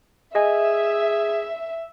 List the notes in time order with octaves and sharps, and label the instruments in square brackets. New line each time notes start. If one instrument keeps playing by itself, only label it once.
[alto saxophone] G#4 [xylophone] D#5 G#5 [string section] E5